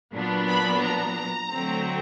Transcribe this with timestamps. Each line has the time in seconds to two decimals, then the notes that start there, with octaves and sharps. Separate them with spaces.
0.14 A#2 F#3 B3 D4
0.49 B5
0.83 A#5
1.52 D3 F#3 A3 C4